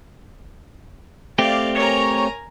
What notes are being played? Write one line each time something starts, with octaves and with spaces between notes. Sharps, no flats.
A3 C4 G4 D5 F5
A#4 C#5 G#5 A#5